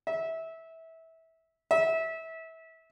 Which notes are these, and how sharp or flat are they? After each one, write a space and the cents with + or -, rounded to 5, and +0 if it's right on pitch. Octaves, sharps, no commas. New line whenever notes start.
E5 -20
E5 -25